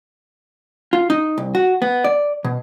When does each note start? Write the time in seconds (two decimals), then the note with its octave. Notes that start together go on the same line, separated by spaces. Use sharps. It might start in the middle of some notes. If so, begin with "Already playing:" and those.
0.93 F4
1.10 D#4
1.38 C2
1.55 F#4
1.82 B3
2.04 D5
2.45 B2